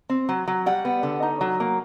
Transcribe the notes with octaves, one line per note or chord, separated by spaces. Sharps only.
C4
F#3
F#3
G3 F#5
B3
D3
D#4
F#3
A#3